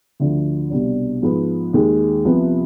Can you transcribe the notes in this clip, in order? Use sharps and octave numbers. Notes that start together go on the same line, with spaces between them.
D2 D3 F3
C2 B2 G3 D4
G#2 F3 B3
D#2 D#3 G#3
C2 C3 F3 B3